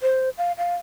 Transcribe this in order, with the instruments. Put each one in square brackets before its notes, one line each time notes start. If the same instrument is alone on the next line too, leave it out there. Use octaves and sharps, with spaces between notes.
[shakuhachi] C5
F5
F5